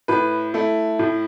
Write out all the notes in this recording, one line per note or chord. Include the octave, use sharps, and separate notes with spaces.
A2 B4
A3 E4
A2